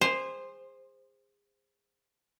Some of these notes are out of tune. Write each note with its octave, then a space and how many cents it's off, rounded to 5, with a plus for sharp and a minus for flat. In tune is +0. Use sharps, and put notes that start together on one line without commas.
G#4 -30 C5 +0